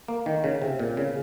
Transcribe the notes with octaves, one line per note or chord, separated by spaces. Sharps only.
A#3
D#3
C#3
C3
A#2
C#3